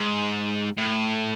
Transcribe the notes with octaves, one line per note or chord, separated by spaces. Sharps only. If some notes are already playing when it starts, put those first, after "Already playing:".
Already playing: G#2
A2